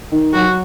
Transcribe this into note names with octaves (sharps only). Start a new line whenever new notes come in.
D#3
F#3 F#4